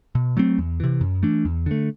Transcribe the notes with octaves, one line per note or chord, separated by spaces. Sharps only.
B2
F#3 A3 C4
E2
C3 E3
F#2
E3 A3 D4
E2
D3 A3